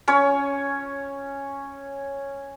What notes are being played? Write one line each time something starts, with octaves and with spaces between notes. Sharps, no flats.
C#4 C#5